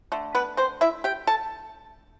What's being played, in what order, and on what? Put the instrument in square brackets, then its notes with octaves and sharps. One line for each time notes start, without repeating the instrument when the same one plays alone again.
[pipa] D3 A3
B3 B4
C4 C5
E4 E5
G4 G5
A4 A5